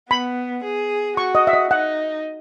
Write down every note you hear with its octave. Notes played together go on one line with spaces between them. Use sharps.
B3 B5
G#4
F#4 C#6
D#5
E5
D#5
D#4 F#5